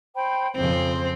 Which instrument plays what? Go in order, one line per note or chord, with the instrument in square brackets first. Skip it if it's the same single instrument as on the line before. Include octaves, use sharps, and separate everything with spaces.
[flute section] C5 G5 B5
[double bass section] F2 C#3 F3 [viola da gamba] C4 [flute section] C5